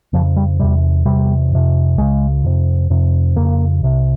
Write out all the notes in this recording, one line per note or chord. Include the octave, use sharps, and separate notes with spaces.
F2 C#3 F3
G3
E2 C3 G3
E2 C3 G3
F2 C3
C#2 C#3 G#3
F2 C3
F2 C3
F2 C#3 A#3
C2 C3